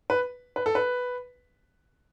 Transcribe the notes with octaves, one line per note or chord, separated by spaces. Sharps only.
B4
B4
A4
B4